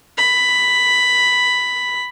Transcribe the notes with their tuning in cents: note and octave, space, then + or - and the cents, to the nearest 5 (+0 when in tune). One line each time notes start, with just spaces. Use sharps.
B5 +5